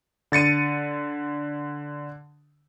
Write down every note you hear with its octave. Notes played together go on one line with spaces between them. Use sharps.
D3 A6 C#7 D#7